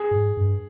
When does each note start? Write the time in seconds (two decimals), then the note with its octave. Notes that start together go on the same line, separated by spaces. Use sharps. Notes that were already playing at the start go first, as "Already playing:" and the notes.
Already playing: G#4
0.11 G#2
0.37 G2